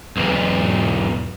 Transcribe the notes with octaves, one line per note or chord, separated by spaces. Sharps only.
B1 E2